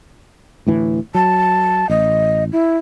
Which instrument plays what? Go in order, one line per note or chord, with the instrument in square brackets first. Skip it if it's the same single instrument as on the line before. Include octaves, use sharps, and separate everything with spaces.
[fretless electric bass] D2 A2 E3
[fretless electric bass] F#3 [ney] A5
[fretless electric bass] A1 [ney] D#5
[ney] E4